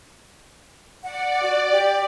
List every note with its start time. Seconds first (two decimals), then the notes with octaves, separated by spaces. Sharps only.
1.03 D5 F#5
1.43 F#4
1.71 G4